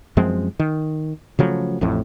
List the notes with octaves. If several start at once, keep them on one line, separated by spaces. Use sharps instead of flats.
F#2 F3 G#3 C4
D#3
C#3 F3 F#3 A3
A1 F2 A2